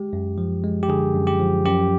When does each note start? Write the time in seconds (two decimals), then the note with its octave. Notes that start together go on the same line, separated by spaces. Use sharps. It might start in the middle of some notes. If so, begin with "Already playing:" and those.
Already playing: G#3 G4
0.13 F#2
0.38 F3
0.64 G#3
0.83 G4
0.89 D3 G#4
1.15 F#2
1.27 G4
1.40 F3
1.65 F#2 G4